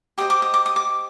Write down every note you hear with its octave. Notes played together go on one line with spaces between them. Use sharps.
G4 C5 D#5 D#6
D6
D#6
D6
D#6
D6